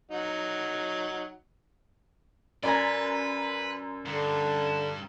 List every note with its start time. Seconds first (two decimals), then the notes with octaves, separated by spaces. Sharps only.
0.11 F#3 D#4 F#5
2.63 F#2 B4 D5 G#5 A#5
4.06 G2 D3
4.65 E7